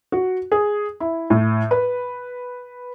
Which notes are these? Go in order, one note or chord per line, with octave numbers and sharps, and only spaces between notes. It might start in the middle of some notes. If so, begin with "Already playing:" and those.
F#4
G#4
E4
A2
B4